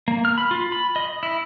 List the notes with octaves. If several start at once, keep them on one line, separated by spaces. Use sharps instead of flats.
A#3
F6
B5
F4
B5
D#5
E4